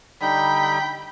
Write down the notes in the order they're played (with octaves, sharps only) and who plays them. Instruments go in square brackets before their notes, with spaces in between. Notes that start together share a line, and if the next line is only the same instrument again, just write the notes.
[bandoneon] D3 G3 D#4 [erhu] G5 [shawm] B5